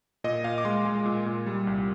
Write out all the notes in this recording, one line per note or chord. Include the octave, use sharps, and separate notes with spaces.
A#2 D#5
A#2 F5
D6
G#3 C6
G#3
A#2
A#2
G3
C2